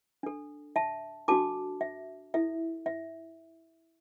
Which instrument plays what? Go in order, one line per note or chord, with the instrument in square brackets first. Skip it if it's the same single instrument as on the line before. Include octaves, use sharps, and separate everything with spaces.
[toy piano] D4 A4
E5 A5
D4 F#4 A4 A5 D6
E5
E4 A4 E5
E5